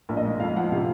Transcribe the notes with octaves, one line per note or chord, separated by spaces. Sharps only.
A#1
D#5
G#2
F2 F5
F3 F#5
C3 F5